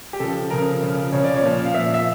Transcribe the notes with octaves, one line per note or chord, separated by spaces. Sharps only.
G4
C#3 F3 A4
C#3 F3 A#4
C#3 F3
C#3 F3 C#5
D5
C#5
A#2 F3
F5
A#2 F3 E5
E5